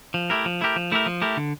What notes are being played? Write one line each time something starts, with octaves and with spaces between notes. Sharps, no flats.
F3
A3 E4 G4 A#4
F3
A3 E4 G4 A#4
F3
A3 E4 G4 A#4
F3
A3 E4 G4 A#4
D3